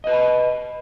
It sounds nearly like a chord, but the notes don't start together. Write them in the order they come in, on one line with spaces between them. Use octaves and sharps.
D#5 B4 A5 B5